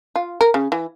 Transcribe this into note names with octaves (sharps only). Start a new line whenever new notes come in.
F4
A#4
C#3
E3